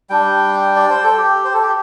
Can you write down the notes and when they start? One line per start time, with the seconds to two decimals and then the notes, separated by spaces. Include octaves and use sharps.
0.10 G3 D4 G5
0.76 D5
0.90 C5
1.04 A4
1.17 G4
1.45 C5
1.54 A4
1.63 G4